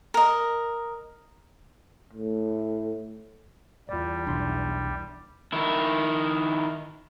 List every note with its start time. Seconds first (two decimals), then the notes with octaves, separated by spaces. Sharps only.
0.14 A#4 D#5
2.13 A2
3.89 E2 G3 F4 D5
4.27 B1 D4 C6
5.53 D#3 E4